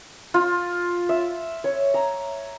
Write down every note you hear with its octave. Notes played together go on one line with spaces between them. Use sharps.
F4
E5
C#5
A#5